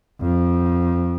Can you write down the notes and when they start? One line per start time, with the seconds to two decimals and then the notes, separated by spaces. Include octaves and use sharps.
0.22 F2